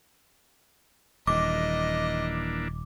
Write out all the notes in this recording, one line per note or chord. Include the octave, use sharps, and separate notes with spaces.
D#1 E3 A#3 D4 D#5 D6